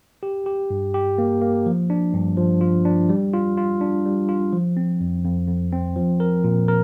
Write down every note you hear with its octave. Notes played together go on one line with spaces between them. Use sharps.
G4
G4
G2
G4
A#3
A#3
F3
D4
G2
F3
F4
D4
G3
F4
F4
D4
G3
F4
F3
C4
F2
F2
F2
C4
F3
A#4
A#2
A#4